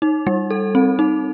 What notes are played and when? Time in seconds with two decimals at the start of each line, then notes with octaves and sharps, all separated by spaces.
0.02 D#4
0.27 G3
0.50 A4
0.75 C4
0.99 D#4